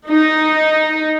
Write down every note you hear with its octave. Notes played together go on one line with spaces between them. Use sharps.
D#4